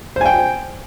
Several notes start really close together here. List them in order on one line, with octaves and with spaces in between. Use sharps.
C5 G#5 G5